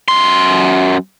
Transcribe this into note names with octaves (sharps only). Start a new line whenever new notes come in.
F#2 C6